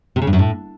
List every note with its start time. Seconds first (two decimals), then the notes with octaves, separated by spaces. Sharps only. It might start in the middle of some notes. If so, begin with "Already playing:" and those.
0.16 C3
0.22 C#3
0.27 G2
0.33 F#2
0.39 A2